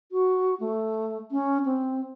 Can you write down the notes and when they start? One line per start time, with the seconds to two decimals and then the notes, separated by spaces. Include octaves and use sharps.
0.12 F#4
0.60 A3
1.31 C#4
1.65 C4